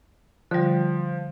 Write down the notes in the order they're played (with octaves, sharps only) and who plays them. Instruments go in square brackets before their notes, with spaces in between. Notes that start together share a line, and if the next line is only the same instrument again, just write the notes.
[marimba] D3 G3 [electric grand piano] F3